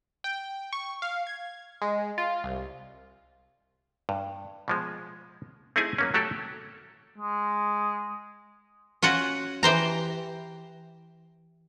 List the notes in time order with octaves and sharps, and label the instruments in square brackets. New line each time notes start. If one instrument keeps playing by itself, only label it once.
[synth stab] G5
C#6
F5
G#6
G#3
F4
C2
[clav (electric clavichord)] G2
B2 F3 G#3
A3 C4 D#4 E4 G#4 G#5
F#3 A#3 C#4
F#3 A3 F#4 G4 A4
[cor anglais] G#3
[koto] C#4 F4 F#4 F#5
E3 G4 C5 A#5